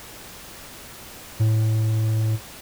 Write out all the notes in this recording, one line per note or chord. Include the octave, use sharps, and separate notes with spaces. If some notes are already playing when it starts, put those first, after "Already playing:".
A2